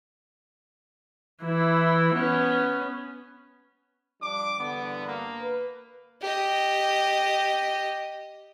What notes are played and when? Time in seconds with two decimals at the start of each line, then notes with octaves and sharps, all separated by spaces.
1.44 E3 E4
2.15 B3 C#4
4.22 F3 G3 D4 D6
4.59 E2 G2 D3 B3
5.07 A#3
5.40 B4
6.22 G4 D#5